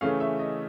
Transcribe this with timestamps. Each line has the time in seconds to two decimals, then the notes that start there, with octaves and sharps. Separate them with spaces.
0.01 C#3 E3 A3 C#4 F5
0.20 E5
0.39 D#5